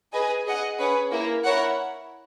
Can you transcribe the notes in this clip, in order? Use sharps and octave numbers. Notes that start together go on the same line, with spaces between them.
G#4 B4 D#5 G#5
G#4 D#5 F#5
C#4 G#4 B4 F#5
A#3 E4 A#4
E4 A#4 C#5 F#5